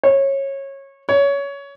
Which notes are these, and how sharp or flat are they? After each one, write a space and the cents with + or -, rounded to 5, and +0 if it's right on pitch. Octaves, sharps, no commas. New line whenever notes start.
C#5 -20
C#5 +20